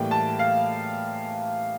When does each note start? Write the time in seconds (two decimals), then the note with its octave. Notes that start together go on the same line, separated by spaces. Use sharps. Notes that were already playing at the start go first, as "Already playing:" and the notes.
Already playing: A2 E3 G3 A#3 G5
0.11 A5
0.39 F5